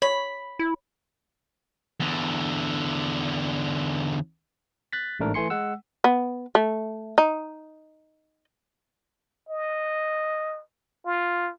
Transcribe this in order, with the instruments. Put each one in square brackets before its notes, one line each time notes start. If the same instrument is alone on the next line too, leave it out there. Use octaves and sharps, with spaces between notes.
[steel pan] C#5 [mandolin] B5
[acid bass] E4
[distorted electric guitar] E2 D3
[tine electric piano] F#6 A6 B6
A1 G#2 A3 D4 A#4
E3 A3 G#5 C6 C#7
G#3 F#5 E6
[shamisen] B3
A3
D#4
[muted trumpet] D#5
F4